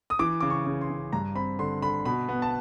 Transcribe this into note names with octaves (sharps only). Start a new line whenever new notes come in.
D#6
E3 D6
C#3 D6
C#6
C#3
C6
C#3
G2 A#5
C4 B5
D3 C6
D3 B5
B2 B5
B3
A5